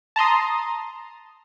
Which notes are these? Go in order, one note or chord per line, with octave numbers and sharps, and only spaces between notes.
A5 A#5 C6 D#6